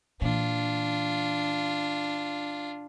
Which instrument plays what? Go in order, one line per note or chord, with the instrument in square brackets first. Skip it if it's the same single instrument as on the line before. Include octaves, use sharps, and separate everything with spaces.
[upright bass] A#2 E3 [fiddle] D4 F4